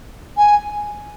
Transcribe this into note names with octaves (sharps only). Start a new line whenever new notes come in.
G#5